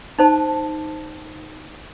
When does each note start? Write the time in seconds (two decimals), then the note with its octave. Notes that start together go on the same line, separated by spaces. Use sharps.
0.19 D#4 C5 A5